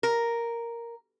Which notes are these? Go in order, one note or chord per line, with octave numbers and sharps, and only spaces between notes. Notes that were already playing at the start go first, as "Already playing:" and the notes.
A#4